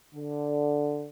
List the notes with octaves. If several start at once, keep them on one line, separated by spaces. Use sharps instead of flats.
D3